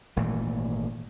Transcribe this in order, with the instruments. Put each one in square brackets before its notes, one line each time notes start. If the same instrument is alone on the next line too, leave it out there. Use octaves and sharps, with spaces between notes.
[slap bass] G#1 A#2 E3 A3